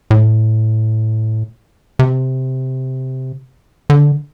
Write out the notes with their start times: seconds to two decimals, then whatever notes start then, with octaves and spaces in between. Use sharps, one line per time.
0.11 A2
1.99 C3
3.90 D3